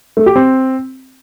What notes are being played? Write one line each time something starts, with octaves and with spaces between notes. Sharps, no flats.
A3
G4
C4